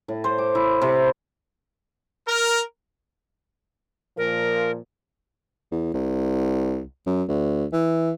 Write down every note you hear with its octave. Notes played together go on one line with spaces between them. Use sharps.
A2
C5
D6
E4
C3
A#4
A#2 F3 A#4
E2
C2
F#2
D2
E3